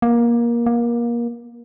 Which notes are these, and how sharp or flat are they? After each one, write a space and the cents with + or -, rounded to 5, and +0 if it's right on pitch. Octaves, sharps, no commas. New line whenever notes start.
A#3 +20
A#3 +25